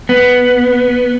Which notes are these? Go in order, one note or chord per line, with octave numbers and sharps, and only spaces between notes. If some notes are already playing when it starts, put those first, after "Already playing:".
B3